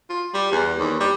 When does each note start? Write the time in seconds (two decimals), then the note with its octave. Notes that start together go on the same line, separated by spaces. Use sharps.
0.10 F4
0.34 G3
0.52 E2
0.79 D#2
1.00 G3